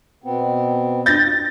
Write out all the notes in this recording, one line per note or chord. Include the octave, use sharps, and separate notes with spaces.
B2 B3 C4
G6 A6 A#6